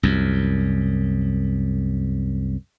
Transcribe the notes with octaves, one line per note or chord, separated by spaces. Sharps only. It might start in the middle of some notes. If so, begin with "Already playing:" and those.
C2 F#2